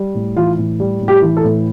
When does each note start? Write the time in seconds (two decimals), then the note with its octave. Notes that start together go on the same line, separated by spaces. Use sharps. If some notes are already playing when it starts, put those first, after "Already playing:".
Already playing: G3
0.15 A2
0.36 E3 F4
0.58 A2
0.80 G3
1.01 A2
1.08 G4
1.22 E3
1.37 A4
1.44 A2